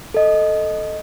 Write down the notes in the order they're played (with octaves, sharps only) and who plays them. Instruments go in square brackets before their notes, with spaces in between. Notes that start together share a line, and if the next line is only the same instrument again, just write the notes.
[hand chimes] A4 D#5